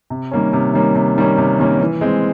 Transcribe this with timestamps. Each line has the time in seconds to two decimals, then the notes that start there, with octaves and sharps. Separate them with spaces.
0.10 C3
0.31 D#3 G3 A#3 C#4
0.53 C3
0.74 D#3 G3 A#3 C#4
0.95 C3
1.17 D#3 G3 A#3 C#4
1.38 C3
1.59 D#3 G3 A#3 C#4
1.80 E3
2.01 G#3 C4